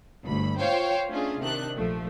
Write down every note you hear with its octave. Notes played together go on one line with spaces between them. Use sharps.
G1 D2 B5
F4 C5 C#5 F5 G5
A3 C#4 D4 F4 G#4
C3 D#3 D4 F#6
A#1 F3 A3